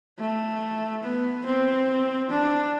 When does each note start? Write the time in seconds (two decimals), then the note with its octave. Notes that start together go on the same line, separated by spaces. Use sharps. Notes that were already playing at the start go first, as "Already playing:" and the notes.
0.19 A3
1.03 B3
1.46 C4
2.30 D4